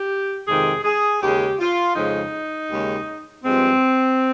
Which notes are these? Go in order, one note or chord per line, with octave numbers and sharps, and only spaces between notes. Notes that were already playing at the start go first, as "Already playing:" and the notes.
Already playing: G4
F2 C3 D#3 G#3 G#4
G#4
D#2 C#3 G#3 G4
F4
F2 C#3 F3 G#3 D#4
D#2 C#3 G#3
G2 F3 G#3 C4